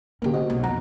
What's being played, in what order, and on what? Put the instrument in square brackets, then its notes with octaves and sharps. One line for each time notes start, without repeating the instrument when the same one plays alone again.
[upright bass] D3 C#4 [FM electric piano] A#3 G4
[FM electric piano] F#4 C5 D#5
[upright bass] B1
[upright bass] F2 [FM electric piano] F#5 A#5